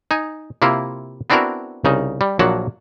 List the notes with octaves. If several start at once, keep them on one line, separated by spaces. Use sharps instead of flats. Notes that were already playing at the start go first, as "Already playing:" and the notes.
D#4 G#5
C3 A#3 E4 F4
B3 C4 D4 E4 F#4 A#4
C2 C#3 D#4
G3
A#1 F3 F#3 A#3 F#5 A5